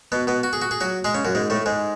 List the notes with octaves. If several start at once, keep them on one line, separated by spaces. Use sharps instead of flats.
B2 B3
B2 B3
F#4
G#4
F#4
G#4
F#3 F#4
G#3 G#4
C#3 C#4
F#2 F#3
G#2 G#3
A2 A3
G#2 G#3